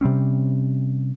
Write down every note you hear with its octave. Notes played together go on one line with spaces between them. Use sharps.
C3 G3 C4 C#4